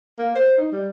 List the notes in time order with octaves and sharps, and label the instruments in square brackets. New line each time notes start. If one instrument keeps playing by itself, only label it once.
[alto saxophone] A#3
C5
D#4
G3